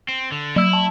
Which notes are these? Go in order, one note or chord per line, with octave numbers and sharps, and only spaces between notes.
C4
D3
F#3 E4 E6
A5